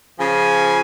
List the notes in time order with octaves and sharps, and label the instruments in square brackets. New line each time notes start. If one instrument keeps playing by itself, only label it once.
[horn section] C#3 F3 G#5